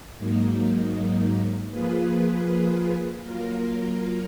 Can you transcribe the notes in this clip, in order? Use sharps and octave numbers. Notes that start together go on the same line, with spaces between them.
G#2 F#3 A#3 D#4
F3 A#3 F4 G#4 B4
F#3 A#3 F4 A#4